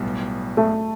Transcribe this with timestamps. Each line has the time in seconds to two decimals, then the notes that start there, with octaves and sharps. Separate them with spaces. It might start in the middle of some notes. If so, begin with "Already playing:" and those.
Already playing: B1 A2 G3 B3
0.57 A3